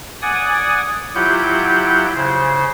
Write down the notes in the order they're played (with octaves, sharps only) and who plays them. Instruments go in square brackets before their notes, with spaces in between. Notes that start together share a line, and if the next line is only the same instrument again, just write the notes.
[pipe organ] D5 F#5 G#5 D#6
F#3 E4 F4 G4 F#5 G6
C#3 C5